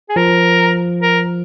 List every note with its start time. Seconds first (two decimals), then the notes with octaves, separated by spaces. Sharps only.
0.09 G#4
0.16 F3 A#4
1.01 A#4